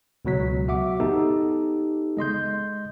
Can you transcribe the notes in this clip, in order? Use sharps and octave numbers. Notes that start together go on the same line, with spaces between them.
C#2 B2 F#3 B6
F#4 E5 F#5 D6
B3 D#4 G4 A4
G#3 D#5 C6 G6